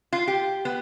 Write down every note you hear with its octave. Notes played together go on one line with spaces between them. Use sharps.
F4
G4
B3